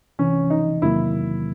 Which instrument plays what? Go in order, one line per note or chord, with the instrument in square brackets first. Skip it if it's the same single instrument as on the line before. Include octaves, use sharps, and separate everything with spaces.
[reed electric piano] C2 C3 E3 [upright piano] C#4
[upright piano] D#4
[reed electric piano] E2 C3 D#3 F#3 A#3 [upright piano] E4